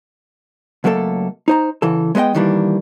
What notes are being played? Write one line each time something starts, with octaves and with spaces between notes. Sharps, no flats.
C#2 F#3 A3 A#3 A4
D#4 C5 A#5
C#3 E3 A4
G#3 B3 B4 D#5 G5
D#3 E3 G3 A#3 D4